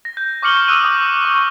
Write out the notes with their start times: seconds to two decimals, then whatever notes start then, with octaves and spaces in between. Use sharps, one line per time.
0.05 A#6
0.17 G6
0.42 C#6 D6 F6 C#7 F#7 G7
0.68 D#6 E6 F#6 D#7
0.85 D6
1.25 C#6